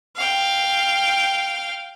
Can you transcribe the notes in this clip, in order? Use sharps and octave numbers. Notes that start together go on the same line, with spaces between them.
F5 G5